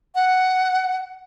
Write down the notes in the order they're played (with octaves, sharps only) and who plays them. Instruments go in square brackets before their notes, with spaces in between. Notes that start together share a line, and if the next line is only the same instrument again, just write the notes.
[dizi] F#5